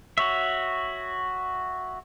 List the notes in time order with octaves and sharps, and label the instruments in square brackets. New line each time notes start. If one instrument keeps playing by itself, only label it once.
[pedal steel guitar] F#4 C#5 E5